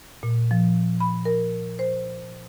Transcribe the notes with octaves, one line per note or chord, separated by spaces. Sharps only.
A#2
F3
B5
A#4
C5